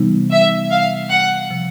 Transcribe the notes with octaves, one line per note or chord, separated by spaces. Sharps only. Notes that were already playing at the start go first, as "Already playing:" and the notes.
Already playing: C3 E3 G3 B3 D#4
E5
F5
F#5
C3 F3